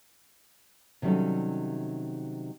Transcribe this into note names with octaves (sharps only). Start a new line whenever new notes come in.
C3 D#3 F#3 G3 C#4 A4